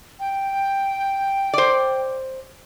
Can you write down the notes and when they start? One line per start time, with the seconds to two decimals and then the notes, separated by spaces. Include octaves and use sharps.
0.20 G5
1.53 C5 D5